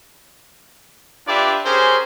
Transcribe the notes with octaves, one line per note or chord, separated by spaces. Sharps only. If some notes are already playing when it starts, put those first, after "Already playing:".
D4 F4 G4 B4 D5 E5
C#4 G4 G#4 A#4 C5